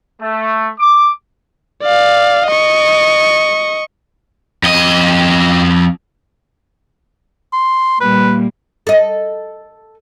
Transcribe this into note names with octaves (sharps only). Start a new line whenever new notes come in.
A3
D6
D5 F5
D#5 C#6
F2 D#5
C6
A#2 G3 A#3 B4
A4 D#5